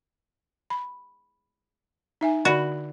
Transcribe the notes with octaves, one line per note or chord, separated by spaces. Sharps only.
B5
D#4 E5 G#5
D3 F#4 D5 B5